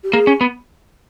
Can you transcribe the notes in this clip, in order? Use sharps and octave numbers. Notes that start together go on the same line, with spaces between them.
G4
A#3 G#4
C#4
B3